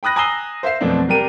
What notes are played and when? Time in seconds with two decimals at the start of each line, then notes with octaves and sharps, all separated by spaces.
0.03 G5 B5 D#6 F#6 A#6
0.16 G#5 A#5 D#6 E6 C7 G7
0.63 C5 E5 F5 C7
0.81 F2 B2 F#3 A3 C4 D4
1.08 C3 G3 D4 A#4 G5 D#7